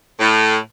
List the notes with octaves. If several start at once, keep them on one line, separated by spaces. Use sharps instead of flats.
A2